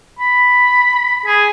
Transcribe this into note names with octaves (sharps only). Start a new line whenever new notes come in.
B5
G#4